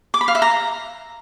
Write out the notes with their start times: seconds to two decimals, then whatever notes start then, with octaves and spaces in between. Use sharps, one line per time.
0.14 D6
0.21 B5
0.28 F5
0.35 E5
0.42 A#5